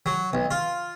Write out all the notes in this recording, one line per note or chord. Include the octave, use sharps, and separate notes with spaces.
F#3
B1
F4